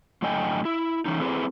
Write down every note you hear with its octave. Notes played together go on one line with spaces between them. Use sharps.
F#2 A2 D3 D#5 G5 G#5
E4
E3 C#4 D#4
A3 C4 E4 G#4 B4